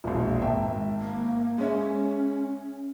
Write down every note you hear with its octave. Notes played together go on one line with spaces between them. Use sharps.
E1 A#1
G#1 E5 G5
A#3
G#3 C#4 C#5 E5